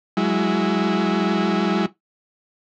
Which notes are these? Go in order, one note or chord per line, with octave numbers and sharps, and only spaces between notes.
F#3 G#3 E4